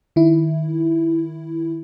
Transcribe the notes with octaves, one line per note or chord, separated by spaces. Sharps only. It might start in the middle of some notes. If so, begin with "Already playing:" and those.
D#3 E4